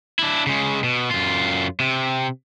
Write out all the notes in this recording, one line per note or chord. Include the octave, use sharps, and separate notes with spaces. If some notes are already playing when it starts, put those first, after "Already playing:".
D4 E4
C#3 G#3
B2
F#2 F4
C3